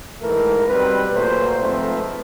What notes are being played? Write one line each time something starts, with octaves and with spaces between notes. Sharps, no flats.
G#2 E3 A3 A#4
B2 G3 C4 B4
A#2 F#3 A3 C5
G#2 F3 A3 C4 B4